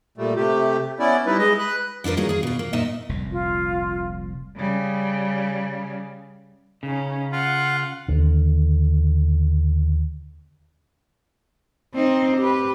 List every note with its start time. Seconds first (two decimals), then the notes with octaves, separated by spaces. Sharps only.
0.18 A#2 G3 A3
0.36 C3 A3 G4
0.99 B3 C#4 E4 D5
1.26 G3 D#4 E4 B4
1.39 G#3 D#5
1.59 B4 F#6
2.04 F3 D4 F4 A#4 B4
2.17 D3 F#3 A#3 D#4 G#4
2.29 G#4 F5
2.43 B2 F4
2.59 A#3
2.73 A#2 D#4 D#5 E5
3.09 F1 C2 A#2
3.32 F4
4.56 C#3 G3
6.83 C#3 C#4 D#4
7.33 F4 F#5
8.08 D#2 D3
11.95 C4 D#4
12.38 G4 B4